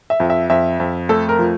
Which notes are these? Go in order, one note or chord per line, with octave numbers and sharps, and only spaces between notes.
E5
F2
E5
F2 E5
F2
A3 A4
A#4
F3